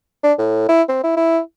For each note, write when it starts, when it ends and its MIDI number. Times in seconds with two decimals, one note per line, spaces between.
0.23 0.33 62
0.38 0.66 45
0.69 0.82 64
0.89 1.03 60
1.04 1.15 64
1.17 1.39 64